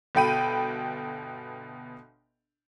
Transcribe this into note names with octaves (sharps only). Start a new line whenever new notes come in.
G1 B2 A4 G5 B5 D#7